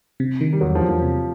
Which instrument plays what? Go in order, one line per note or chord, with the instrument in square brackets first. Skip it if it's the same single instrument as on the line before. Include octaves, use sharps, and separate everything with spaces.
[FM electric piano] C3
D#3
[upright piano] G3
[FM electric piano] E2 [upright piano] F#3
[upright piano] F3
[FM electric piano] E2
[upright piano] F3
[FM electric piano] C3